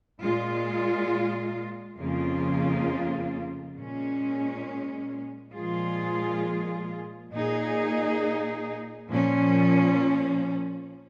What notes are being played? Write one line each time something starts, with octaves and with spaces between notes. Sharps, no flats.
A#2 G#3 F4
F2 C#3 A#3 F4
A#2 G#3 C#4
A#2 F3 G#3 F4 G#4
A#2 A#3 D#4 G#4
A#2 F3 C#4